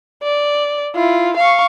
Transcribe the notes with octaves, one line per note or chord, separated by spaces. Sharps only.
D5
E4 F4
F5 C#6